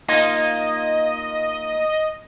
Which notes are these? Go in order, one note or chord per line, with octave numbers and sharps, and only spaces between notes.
A#3 D#4 F4 D#5